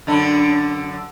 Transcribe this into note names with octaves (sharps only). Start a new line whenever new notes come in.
F#2 D3 D4